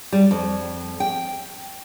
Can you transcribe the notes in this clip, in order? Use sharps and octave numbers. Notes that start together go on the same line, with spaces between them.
G3
F2
G5